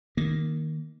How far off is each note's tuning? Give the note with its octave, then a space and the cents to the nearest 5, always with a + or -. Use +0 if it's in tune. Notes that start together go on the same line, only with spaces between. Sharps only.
D#3 +0 A#3 +0